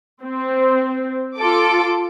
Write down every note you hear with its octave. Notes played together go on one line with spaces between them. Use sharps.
C4
F4 A4 D6